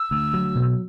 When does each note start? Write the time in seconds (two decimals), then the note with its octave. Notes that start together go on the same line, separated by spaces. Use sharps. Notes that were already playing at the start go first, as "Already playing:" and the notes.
Already playing: E6
0.11 D2
0.34 F#3
0.55 B2